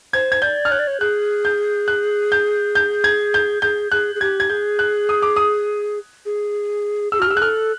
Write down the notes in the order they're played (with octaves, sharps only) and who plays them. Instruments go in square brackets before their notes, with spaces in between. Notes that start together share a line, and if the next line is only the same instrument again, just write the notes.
[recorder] C5 [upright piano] G#6
[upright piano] G#6
[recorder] D5 [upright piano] G6
[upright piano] F6
[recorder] C#5 [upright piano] F#6
[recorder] D5
C#5
[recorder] G#4 [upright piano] F#6
[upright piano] G6
F#6
G6
G6
G#6
G6
[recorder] G#4 [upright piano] G6
[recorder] G#4 [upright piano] F#6
[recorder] G#4
[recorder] G4 [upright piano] G#6
[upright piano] G#6
[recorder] G#4 [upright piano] G6
[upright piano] F#6
D#6
D6
D#6
[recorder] G#4
[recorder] G#4 [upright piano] E6
[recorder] F#4 [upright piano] F6
[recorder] G4
[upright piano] E6
[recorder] G#4 [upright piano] F#6
[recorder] A4 [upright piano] F6